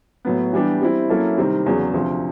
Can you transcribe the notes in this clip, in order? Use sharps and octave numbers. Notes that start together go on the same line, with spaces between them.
A2 F#3 B3
E3 G3 B3 D4 G4
G3 C4 E4
F#3 A#3 C#4 E4 A4
C3 D#3 G3 C4
E2 C#3 F#3
D2 C3 F3